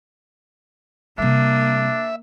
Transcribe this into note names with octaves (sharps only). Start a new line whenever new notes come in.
C3 G3 A#3 D4 E5